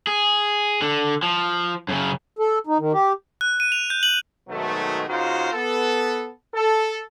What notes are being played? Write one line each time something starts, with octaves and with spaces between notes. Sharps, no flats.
G#4
D3
F3
F#2 C#3
A4
D#4
D#3
G4
F#6
D#7
F7
G6
F#7
G#2 B2 D#3 F#3 A3
C#3 D#4 F4 F#4 A#4 C5
B3 A4
A4